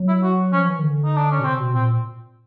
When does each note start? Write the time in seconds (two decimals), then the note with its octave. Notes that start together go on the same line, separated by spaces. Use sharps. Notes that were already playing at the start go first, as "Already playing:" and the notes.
Already playing: F#3
0.08 E4
0.23 F#4
0.52 F3 C#4
0.68 E3
0.79 D#3
0.83 D3
1.05 D#4
1.17 D4
1.31 C#4
1.40 B2
1.44 C3 C4
1.59 B2
1.74 A#2 C4